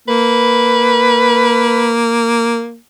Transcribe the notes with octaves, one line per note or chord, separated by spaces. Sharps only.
A#3 B4